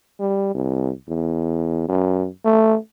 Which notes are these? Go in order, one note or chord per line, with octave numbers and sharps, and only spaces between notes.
G3
C2
E2
F#2
A3